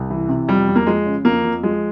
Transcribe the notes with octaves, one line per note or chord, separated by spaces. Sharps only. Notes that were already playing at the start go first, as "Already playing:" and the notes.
Already playing: C2
E3
C3
F2 G3
F2
A#3
F3 G#3
C#3
F2 A#3
F2
F3 G#3